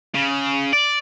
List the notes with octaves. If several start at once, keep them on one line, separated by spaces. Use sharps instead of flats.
C#3
D5